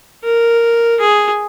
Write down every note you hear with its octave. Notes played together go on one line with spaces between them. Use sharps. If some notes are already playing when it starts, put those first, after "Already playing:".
A#4
G#4